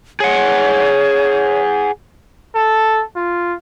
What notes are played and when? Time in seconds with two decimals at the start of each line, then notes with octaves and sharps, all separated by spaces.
0.20 G#4 C#5 F#5
2.55 A4
3.16 F4